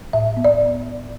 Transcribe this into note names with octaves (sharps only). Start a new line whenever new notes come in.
A2 E5
B3
D5